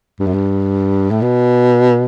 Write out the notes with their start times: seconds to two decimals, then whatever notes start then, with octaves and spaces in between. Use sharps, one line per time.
0.20 G2
0.27 F#2
0.34 G2
1.11 A2
1.22 B2